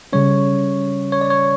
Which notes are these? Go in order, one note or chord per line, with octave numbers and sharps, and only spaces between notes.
C#3 G3 C#4 C#5
C#5
D5
C#5